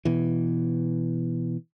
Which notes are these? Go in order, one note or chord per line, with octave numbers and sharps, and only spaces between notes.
B2 E3